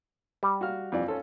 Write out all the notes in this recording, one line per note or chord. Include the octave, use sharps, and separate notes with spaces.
G3
F#4 F5 F6
F2 E3 D5
C#4 F4 A4